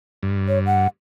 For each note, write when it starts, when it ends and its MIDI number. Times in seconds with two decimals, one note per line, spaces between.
0.23 0.87 43
0.48 0.59 73
0.66 0.88 78